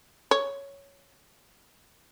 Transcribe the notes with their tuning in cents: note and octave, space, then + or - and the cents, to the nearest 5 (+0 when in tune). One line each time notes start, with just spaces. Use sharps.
C#5 +5